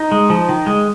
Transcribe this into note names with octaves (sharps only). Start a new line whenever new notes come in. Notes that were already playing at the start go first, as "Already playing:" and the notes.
Already playing: D#4
G#3
F3
D#3
G#3